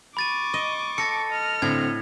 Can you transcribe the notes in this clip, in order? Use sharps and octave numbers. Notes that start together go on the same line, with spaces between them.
B5 C#6 D6 A6 D#7
D#5
A4 A6 A#6 C#7
D#5 F6
A2 D3 C4 G#6